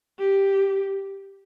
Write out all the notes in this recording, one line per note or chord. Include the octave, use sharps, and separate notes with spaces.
G4